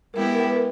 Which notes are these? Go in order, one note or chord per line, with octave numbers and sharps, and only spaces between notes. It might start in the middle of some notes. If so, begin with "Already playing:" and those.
G#3 B3 E4 G4 A#4
A#4
B4
A#4